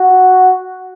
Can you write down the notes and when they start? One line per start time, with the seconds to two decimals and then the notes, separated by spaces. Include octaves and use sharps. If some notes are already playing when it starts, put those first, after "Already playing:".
Already playing: F#4